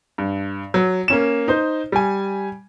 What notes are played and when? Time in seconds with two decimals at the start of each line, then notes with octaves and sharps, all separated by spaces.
0.18 G2
0.74 F#3
1.08 A#3 C#4 E7
1.48 D#4 C5
1.92 G3 G#5